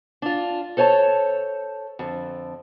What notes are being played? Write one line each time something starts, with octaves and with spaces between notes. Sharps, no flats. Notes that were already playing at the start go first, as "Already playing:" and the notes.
D4 F4
A4 C5 C#5 G#5 A5
F2 D3